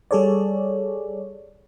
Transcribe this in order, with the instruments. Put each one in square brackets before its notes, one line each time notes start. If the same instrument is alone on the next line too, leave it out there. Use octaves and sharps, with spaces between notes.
[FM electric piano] G3 G#4 A4 C#5 D5